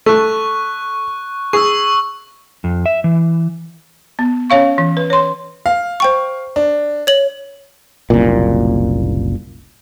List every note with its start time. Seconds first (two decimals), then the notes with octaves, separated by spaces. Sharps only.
0.06 A3 C#6 F#6
1.53 G#4 C#6 E6
2.64 F2
2.86 E5
3.04 E3
4.19 B3
4.50 C#4 C#5 F5 C#6
4.78 E3
4.97 B4
5.10 C#5 C6
5.66 F5
6.00 C5 G5 C#6
6.56 D4
7.07 C#5 F#7
8.10 F#1 C2 A#2